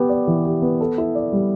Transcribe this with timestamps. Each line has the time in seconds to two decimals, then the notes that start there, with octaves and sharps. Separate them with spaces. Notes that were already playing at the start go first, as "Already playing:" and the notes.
Already playing: B3 G4
0.09 D5
0.27 E3
0.45 G4
0.62 B3
0.81 A4
0.98 E4
1.15 D5
1.32 G3